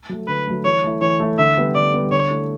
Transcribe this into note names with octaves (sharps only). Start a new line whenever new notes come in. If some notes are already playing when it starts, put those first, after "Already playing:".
F#3 A3
D3 B4
F#3 A3
E3 C#5
A3 E4
E3 C#5
A3 E4
D3 E5
G3 B3
D3 D5
G3 B3
D3 C#5
A3 E4